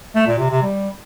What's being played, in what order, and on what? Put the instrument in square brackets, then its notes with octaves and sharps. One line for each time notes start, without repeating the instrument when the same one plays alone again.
[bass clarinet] A3
A#2
C3
C3
G3